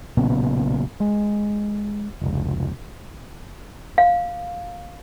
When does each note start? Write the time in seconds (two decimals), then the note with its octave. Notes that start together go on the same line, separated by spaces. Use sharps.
0.17 B1 A#2 C#3 B3
1.00 G#3
2.21 F1 C#2
3.98 F5